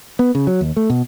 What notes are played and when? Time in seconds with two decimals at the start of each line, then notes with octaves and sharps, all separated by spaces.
0.19 B3
0.35 C#3
0.47 F#3
0.61 D#2
0.77 A3
0.90 B2